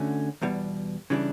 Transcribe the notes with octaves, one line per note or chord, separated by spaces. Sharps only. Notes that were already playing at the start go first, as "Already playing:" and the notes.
Already playing: D3 A3 C#4 F#4
E2 B2 G3
C#3 E3 G3 D4